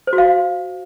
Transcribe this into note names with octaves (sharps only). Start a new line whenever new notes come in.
C5
F#4
F5